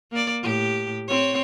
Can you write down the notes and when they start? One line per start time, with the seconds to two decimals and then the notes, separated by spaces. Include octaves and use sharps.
0.11 A#3 D5
0.42 A2 G4
1.08 C4 C#5